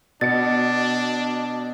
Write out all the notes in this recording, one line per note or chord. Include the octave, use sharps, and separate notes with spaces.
B2 D4 A6 C#7